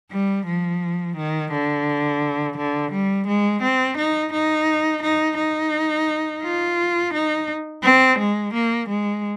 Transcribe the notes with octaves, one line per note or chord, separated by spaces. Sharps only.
G3
F3
D#3
D3
D3
G3
G#3
C4
D#4
D#4
D#4
D#4
F4
D#4
C4
G#3
A#3
G#3